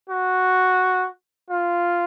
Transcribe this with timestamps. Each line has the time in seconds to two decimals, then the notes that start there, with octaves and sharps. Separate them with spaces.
0.10 F#4
1.50 F4